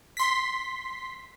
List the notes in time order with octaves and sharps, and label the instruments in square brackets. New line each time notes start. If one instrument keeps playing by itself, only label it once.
[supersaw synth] C6 B6